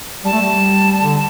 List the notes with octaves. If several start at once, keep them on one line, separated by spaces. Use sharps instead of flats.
G3 A5
A3
G3
D3